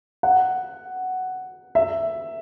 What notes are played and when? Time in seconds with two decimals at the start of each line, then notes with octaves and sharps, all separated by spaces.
0.23 F#5
1.75 E5